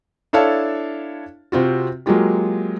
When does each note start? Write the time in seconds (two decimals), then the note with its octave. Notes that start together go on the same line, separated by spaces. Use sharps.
0.33 D4 E4 A4 C#5 F5 A5
1.52 C3 C4 F4 F#4
2.06 F#3 G#3 A#3 F4 G4